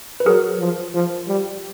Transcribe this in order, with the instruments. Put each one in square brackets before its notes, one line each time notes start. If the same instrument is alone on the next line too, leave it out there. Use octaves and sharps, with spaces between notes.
[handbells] B4
[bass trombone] F#3 [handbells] G#4 A#4
[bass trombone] F3
F3
G3